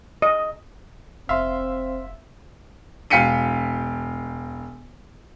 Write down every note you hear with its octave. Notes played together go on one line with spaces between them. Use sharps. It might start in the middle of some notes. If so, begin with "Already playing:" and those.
D#5
F1 C4 E5 F5 C6
E1 F5 G5 B6 C#7 D#7